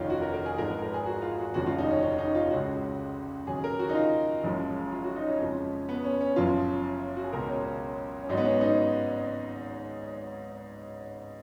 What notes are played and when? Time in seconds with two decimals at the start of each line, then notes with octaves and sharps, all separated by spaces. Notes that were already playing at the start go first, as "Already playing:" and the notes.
Already playing: F1 D#2 D#3 C#4 D#4 F4
0.10 F#4
0.22 A#4
0.34 A#4
0.46 G#4
0.58 G#1 G#2 F3 G#3 A#4
0.71 B4
0.82 A#4
0.94 G#4
1.06 F#4
1.22 F4
1.39 F#4
1.54 F1 D#2 C#3 F3 G#3 F#4
1.66 F4
1.78 D#4
1.90 C#4
2.02 C#4
2.18 D#4
2.35 F4
2.50 C#2 C#3 G#3 F#4
3.47 D#2 C#3 F#3 G#4
3.64 A#4
3.79 F#4
3.89 D#4
3.95 F4
4.44 F#1 F#2 F3 G#3
4.92 F4
5.04 F#4
5.16 D#4
5.28 C#4
5.40 F2 C#3 F3 G#3
5.89 B3
6.04 C#4
6.21 C#4
6.36 F#1 F#2 F3 F4
7.17 F#4
7.24 G#4
7.33 C#2 B2 G#3 A#4
7.48 C#4
7.65 C#4
8.22 C#4
8.29 G#1 G#2 F#3 D#4
8.37 B3
8.45 C#4
8.61 D#4